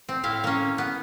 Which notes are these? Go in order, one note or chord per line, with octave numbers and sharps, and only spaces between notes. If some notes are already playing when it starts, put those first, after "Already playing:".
C4
A2 E4 F5
A#3 C#4
B3